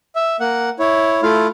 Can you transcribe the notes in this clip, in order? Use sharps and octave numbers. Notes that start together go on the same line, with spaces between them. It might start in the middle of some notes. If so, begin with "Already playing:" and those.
E5
A#3 F#5
E4 C#5
A3 E4 F4 F5